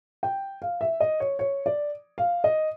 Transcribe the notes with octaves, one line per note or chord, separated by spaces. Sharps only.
G5
F5
E5
D#5
C#5
C#5
D5
F5
D#5